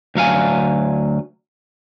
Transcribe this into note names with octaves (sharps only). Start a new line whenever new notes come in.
D2 F#3 F5 G#5